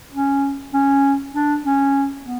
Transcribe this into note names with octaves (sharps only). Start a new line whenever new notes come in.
C#4
C#4
D4
C#4
B3